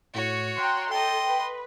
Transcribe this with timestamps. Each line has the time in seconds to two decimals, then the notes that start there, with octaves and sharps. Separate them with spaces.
0.14 A2 F#4 C#5
0.58 G5 A#5 C6 F#6
0.91 A4 D#5 G5 C6
1.28 B4